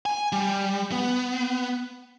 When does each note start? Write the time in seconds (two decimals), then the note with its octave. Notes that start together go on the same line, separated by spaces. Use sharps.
0.06 G#5
0.32 G3
0.92 B3